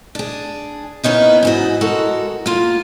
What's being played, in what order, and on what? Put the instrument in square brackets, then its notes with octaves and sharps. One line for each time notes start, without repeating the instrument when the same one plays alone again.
[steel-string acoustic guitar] D4 G#4
A#3 B3 C#4 D#4 E4
G#2 E3 F#4
G#3 F#4 A4 A#4
A#3 F4